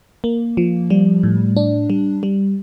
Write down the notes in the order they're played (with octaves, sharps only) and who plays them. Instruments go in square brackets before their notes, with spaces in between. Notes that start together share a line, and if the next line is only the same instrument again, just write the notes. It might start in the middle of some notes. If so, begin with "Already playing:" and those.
[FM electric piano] A#3
F3
G3
A2
D4
G3
G3